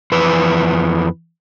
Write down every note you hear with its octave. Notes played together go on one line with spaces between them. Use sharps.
F2 E3 B4